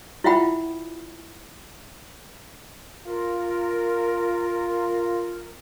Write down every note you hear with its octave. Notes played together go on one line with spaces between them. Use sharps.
E4 F4 E5 F#5 G5 B5
F4 A#4